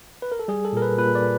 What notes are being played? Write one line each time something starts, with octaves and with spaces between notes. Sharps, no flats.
B4
A#4
A4
G3 G#4
A4
A#2 A#4
B4
A#2 B4
D5